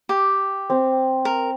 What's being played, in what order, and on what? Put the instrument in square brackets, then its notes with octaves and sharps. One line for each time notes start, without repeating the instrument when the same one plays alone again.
[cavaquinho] G4
[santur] C4
[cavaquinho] A#4